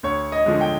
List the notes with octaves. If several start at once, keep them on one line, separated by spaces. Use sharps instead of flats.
D2 C#5
D#5
D3 F3 G#3
G5